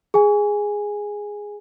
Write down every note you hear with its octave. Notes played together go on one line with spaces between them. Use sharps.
G#4 G#5